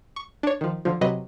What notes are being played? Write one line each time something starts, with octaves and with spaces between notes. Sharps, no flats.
C#6
D4 C#5
D#3 F3
D3 F3
C3 F#3 B4 D#5